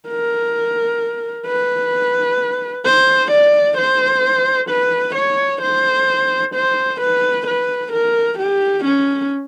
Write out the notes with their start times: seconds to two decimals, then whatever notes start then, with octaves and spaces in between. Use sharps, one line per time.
0.09 A#4
1.46 B4
2.85 C5
3.31 D5
3.77 C5
4.69 B4
5.16 C#5
5.61 C5
6.55 C5
7.01 B4
7.47 B4
7.92 A#4
8.38 G4
8.85 C#4